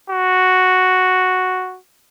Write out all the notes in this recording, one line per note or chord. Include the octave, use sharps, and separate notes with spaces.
F#4